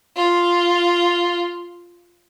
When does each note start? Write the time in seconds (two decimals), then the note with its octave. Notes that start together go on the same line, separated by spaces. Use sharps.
0.16 F4